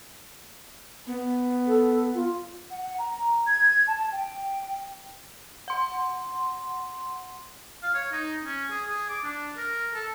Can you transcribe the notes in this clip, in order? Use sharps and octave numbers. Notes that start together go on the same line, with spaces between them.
B3
A4
F4
F#5
A#5
G#6
A5
G5
F#5 C6
F5
C#5
D#4
C#4
G#4
G#4
D6
D4
A#4
A4